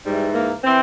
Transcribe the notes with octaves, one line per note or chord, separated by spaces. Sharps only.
G#2 E3 G3
A#3
E3 C4